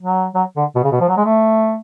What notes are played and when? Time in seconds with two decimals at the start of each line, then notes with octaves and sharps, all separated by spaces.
0.02 F#3
0.35 F#3
0.56 D3
0.75 B2
0.84 C#3
0.92 B2
1.00 F3
1.08 F#3
1.17 G#3
1.25 A3